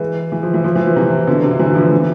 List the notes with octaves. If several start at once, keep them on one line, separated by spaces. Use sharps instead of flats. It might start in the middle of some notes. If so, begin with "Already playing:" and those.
Already playing: E3 G#3
E3
F3
E3
F3
E3
F3
C3 E3
B2 D3
C3
D3
C3 E3
D3 F3
E3